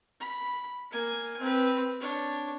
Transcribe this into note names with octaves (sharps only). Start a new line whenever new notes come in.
B5
A#3 G#5
C4 B4
D4 C#5